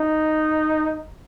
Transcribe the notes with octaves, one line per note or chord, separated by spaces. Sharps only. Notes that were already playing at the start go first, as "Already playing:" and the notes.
Already playing: D#4